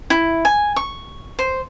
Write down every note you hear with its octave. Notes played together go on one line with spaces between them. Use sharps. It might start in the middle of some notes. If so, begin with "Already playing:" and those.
E4
G#5
C#6
C5